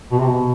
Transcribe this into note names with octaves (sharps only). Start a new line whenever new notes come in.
B2
C3
B2